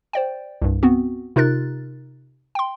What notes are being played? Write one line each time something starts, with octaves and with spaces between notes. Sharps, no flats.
C5 D5 G5
C2 G2
B3 C4 F#4
C3 D#4 F4 A#4 F#6 A6
G5 C6